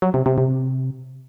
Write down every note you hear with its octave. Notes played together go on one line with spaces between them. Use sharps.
F#3
C3
C3
C3